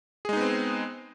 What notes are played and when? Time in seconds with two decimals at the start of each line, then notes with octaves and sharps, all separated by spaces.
0.25 G#4
0.29 G#3
0.33 D#4
0.37 B3
0.41 C4